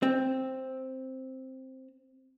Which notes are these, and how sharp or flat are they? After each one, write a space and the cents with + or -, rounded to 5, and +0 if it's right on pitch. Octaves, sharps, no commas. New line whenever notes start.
C4 +5